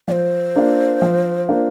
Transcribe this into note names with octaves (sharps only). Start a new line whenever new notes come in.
F3 C5 D5
A#3 D4 F4
F3
A#3 D4 F4